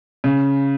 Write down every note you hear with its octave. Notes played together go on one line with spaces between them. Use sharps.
C#3